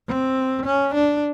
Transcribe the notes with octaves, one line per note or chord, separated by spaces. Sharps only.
C4
C#4
D4